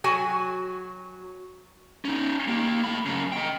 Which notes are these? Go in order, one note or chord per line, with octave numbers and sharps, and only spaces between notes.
F#3 F#4 G#5
C#4 D#4
A#3 G4
A3 B5
F#2 C#3
D#5 G5